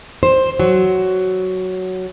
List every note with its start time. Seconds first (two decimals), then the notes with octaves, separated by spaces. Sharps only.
0.23 C5
0.60 F#3